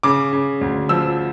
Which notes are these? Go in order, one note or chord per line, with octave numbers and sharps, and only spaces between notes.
C#3 D6
C#3
D2
F3 E6